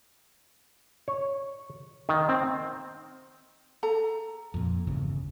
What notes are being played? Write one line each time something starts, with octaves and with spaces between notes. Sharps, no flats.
C#5
D#3
C4
A4 A#5
F2 A#2
G1 E2 C#3